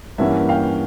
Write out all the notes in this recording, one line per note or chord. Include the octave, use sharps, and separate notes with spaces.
G2 E3 G3 A#3 C#4 E5 F#5
F5 G5